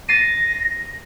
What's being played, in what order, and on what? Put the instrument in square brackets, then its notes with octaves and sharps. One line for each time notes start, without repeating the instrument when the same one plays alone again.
[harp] A6 C7 D#7 [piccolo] A#6